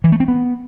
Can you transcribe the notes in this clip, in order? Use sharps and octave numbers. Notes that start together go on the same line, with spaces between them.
E3
A3
C4
B3